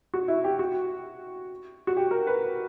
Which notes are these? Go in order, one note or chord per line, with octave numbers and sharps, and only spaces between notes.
F#4
E4
G4
F#4
F#4
G4
A#4
B4